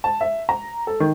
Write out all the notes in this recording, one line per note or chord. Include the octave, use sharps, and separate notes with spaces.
A5
E5
A#5
A4
D#3